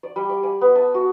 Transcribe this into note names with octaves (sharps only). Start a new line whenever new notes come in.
D5
G3
D6
G#5
B3
A5
F#4